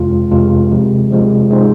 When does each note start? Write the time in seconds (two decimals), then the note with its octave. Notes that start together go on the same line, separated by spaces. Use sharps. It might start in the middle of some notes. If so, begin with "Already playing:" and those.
Already playing: F2 C3 G#3 F4
0.31 F2 C3 G#3 F4
0.70 C3 F3 G#3
1.11 C3 F3 G#3
1.50 C3 F3 G#3 D#4 C5